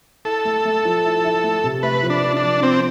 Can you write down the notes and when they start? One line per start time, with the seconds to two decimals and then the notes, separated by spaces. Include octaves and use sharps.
0.25 E4 A4
0.45 A3
0.65 A3
0.85 F3
1.04 E4
1.24 E4
1.44 A3
1.64 C3
1.83 A3 B4
2.03 F3
2.10 D4
2.22 F3
2.37 D4
2.43 F3
2.62 F3 C4